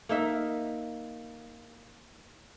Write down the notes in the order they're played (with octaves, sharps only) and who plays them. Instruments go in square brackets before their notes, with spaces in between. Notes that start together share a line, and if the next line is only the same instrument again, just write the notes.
[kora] A#3 D#4 E5